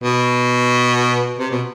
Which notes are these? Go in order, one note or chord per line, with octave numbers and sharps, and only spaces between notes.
B2
C3
B2